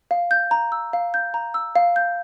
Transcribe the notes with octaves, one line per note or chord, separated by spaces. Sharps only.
F5
G6
A#5
E6
F5
G6
A#5
E6
F5
G6